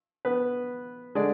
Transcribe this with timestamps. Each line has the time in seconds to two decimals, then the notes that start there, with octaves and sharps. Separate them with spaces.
0.25 B3 B4
1.15 D3 G#3 D4 D5